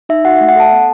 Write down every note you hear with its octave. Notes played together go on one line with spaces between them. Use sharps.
D#4 E5
F#4 F#5
A3 E5
F#5
A4 A5
B3